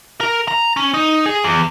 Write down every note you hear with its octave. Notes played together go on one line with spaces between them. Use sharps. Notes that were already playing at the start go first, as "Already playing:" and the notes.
A#4
A#5
C#4
D#4
G#4
E2